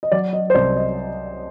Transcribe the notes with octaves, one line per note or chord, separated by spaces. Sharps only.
D#5
F#3 D5
D#5
C5
C2 D5
D#5